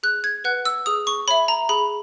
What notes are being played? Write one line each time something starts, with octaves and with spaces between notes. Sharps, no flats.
G#4 F#6
G#6
B4 F#5 F#6
E6
G#4 D#6
C#6
C#5 E5 B5
A#5
G#4 B5